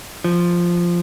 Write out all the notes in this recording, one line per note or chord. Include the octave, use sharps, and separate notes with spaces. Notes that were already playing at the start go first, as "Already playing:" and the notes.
F3